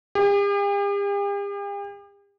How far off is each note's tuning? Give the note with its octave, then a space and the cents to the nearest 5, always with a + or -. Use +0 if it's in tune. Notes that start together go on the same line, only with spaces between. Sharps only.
G4 +45